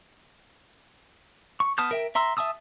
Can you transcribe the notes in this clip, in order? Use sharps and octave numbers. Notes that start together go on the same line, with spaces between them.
C#6
B3 A5 D#6 F6 G6
A#4 E5 G5
E5 A#5 C6 E6
E5 G5 A5 D#6 E6